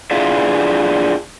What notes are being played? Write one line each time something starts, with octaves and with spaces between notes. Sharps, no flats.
D4 E4 F4 G#4 E5 F5